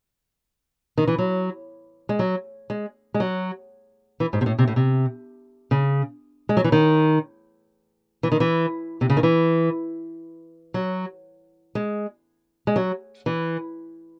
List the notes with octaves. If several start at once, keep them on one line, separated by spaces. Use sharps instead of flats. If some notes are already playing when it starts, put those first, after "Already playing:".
D#3
E3
F#3
G#3
F#3
G#3
G#3
F#3
E3
G#2
C3
A2
C3
A2
C3
C#3
G#3
F#3
E3
D#3
E3
D#3
E3
C3
C#3
D#3
E3
F#3
G#3
G#3
F#3
E3